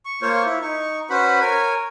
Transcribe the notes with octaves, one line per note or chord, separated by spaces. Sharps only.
C#6
A#3 F4 C5 C#5 C#6
E4
D#4 C#6
C#4 F#4 B4 C5 B5
A#4 C#5 G#5